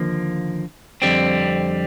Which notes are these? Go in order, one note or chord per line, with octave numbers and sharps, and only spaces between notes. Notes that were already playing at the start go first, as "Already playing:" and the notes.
Already playing: D#2 D3 F3 A#3
F2 D3 G3 C4